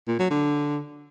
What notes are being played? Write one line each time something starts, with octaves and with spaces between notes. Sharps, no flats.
A#2
F#3
D3